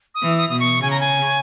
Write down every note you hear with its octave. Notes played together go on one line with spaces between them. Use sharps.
D#6
E3
D#6
B2 D#6
C#6
C#3 G#5
A#5
G#5